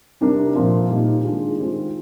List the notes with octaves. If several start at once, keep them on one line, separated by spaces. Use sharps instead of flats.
C3 G3 D4 G4 A#4
A#2 F3 C4 F4 A#4
A#2 G3 A#3 D#4
D#3 G#3 D4 F4
D#3 G#3 C4 F4 G#4